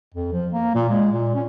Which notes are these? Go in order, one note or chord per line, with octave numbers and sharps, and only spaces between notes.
F2
F3
A#3
A#2
G#3
A#2
C#4